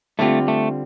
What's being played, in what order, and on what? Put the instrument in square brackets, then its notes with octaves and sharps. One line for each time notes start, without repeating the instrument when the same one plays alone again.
[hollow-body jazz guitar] D3 G3 C4 F4 [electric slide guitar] A3
[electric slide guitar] A3